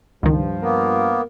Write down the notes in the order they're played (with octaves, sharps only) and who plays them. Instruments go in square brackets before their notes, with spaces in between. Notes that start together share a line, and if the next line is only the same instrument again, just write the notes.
[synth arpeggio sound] C#2 D#3 [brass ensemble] G2 F3
[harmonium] A#3 B3 [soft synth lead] A#4